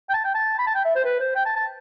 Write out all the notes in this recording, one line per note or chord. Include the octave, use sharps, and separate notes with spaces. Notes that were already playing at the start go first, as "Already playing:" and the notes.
G5
A5
G5
A5
B5
A5
G5
E5
C5
B4
C5
G5
A5
A5